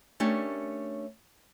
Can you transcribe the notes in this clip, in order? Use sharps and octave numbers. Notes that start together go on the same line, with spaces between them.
A3 C#4 D4 G4 A#4 C#5